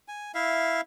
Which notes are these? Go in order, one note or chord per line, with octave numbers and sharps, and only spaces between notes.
G#5
E4 E5 F5